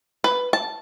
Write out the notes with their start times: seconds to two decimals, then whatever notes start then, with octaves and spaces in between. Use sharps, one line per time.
0.24 B4
0.53 A5